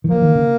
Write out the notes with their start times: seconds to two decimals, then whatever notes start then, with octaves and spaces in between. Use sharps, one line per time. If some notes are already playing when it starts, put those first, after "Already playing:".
0.04 D#3
0.09 F3 A#3
0.22 D#3
0.35 C#3